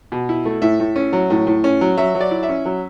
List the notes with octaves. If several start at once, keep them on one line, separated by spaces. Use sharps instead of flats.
B2
E4
A3
A2 E5
A2
C#4
F#3
A2
A2
C#4
F#3
F#3 E5
F#3
D5
E4
E5
C#4
F#3